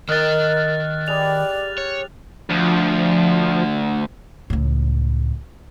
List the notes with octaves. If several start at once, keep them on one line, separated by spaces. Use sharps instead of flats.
D#3 A#4 D#5 G5 F6 F#6 A6
G4 G#4 B4 D5 F7
C#5
D2 F3
C#2 A2